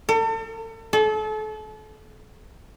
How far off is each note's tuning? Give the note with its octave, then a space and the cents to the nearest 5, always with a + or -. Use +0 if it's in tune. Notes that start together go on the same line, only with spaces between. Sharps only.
A4 +40
A4 -35